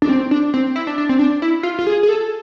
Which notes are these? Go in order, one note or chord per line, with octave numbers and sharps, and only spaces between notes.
D4
C4
D4
C4
E4
D4
D4
C4
D4
E4
F4
F4
G#4
G#4
A4